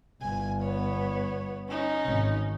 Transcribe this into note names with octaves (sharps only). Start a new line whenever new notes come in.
G1 G#5
B3 C#5
C#4 D#4
G#1